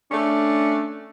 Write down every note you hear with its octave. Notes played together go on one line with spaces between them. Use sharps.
A3 C#4 D4